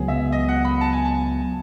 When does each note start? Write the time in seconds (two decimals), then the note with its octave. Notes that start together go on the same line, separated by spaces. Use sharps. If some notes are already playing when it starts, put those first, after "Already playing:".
Already playing: C#2 C#3 F#3 B3 G#4
0.08 E5
0.32 D#5
0.49 F#5
0.65 B5
0.81 A5
0.93 G#5
1.05 A5